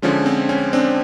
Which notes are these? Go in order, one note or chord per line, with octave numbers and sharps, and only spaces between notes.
D3 F3 G#3 C#4
C4
C#4
C4 D4